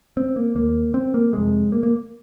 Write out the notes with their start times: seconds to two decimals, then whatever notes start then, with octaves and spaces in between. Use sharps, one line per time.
0.17 C4
0.36 A#3
0.55 D#2 A#3
0.94 C4
1.14 A#3
1.33 F2 C3 G#3
1.72 A#3
1.83 A#3